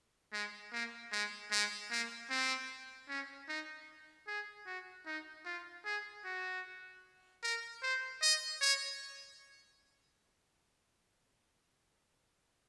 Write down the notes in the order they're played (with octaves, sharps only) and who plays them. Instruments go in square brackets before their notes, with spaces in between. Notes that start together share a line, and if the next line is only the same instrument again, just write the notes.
[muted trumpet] G#3
A#3
G#3
G#3
A#3
C4
C#4
D#4
G#4
F#4
D#4
F4
G#4
F#4
A#4
C5
D#5
C#5